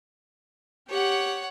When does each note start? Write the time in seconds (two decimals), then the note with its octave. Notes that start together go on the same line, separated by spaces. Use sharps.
0.89 G4 C#5 F#5